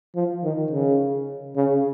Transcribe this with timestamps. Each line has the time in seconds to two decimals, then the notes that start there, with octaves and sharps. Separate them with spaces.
0.15 F3
0.44 D#3
0.71 C#3
1.56 C#3